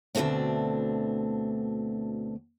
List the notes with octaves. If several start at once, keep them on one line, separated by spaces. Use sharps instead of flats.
D2 B2 D3 A3 C4 D4